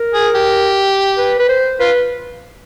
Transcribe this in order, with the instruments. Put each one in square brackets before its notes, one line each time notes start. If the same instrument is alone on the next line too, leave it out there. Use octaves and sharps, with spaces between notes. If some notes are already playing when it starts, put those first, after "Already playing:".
Already playing: [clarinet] A#4
[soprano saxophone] G#4
G4
[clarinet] B4
B4
C5
[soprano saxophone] F4 [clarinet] B4